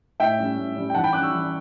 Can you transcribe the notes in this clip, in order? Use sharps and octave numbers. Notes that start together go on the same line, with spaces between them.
A2 E5 G5
G3 C#4
A2
G3 C#4
G5
E3 F#5 A5
G5 B5
G3 C#4 D6 F#6
C#6 E6
E3